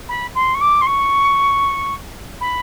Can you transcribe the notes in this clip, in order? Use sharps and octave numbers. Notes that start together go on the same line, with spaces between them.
B5
C6
C#6
D6
C6
C#6
B5